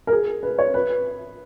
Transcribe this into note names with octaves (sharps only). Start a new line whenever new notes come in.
A#4
G#4
B4
C#5
B4